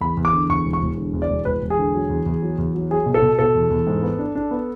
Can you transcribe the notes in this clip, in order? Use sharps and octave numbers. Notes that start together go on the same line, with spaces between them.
E2 B5
E2
D6
D3
E2 C#6
E1
C#6
E1
D3
E2
D5
E1
E1 B4
E1
G#4
D3
F#3
E2
E2
F#3
E2
F#3
F#3 G#4
B2
A4
B2
B2 A4
E2
E2
G#2
B3
D4
D4
B3